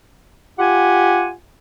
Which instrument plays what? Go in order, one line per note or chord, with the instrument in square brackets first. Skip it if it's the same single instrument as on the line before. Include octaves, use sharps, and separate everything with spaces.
[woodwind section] F4 G4 F#5 G#5